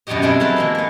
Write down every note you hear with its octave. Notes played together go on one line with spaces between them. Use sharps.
F#2 B2 F#3 D4 G4 D#5
G3 G#3 C4 D4 E4
F#3 E4 G#4 A4 B4 C5
E3 G#3 A#3
A#3 B3